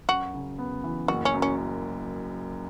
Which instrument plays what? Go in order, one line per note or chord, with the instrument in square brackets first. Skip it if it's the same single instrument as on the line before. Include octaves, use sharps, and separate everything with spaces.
[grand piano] F#2 [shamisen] F#4
[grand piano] C#3
B3
E3
[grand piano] F#1 [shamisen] F#4
[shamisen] C#4
[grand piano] F#2
[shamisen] C#4